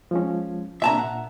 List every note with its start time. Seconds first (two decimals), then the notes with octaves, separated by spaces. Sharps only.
0.11 F3 G#3 C#4
0.82 C3 A#3 D4 E5 A5 A#5
0.97 A#2 F#5